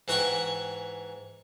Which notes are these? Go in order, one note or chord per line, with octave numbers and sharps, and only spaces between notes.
G#2 E3 F#4 F#5 G5 C#6